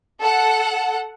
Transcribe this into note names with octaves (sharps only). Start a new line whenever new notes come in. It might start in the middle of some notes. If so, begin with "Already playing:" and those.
A4 F#5